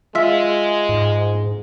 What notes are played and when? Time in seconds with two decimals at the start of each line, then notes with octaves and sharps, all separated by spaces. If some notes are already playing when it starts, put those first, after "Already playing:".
0.15 G#3 F4 E5
0.89 G#2